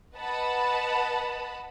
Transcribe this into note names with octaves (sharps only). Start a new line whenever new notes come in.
B4 D#5 F#5 A5 B5